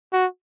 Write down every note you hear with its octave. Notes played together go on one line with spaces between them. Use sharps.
F#4